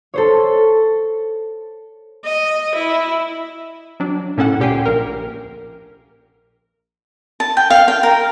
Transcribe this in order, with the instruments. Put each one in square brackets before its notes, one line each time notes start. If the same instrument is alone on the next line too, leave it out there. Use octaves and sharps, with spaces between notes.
[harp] A4 C5 C#5
[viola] D#5
E4
[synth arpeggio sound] F#3 D4
A2 C#4 A4 F#5
D2 A#2 G4 G5 G#5 C7
A#1 A#4
[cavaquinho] A5
G5
F5
G5
A#4